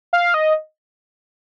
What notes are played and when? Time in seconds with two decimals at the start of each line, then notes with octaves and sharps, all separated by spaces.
0.13 F5
0.34 D#5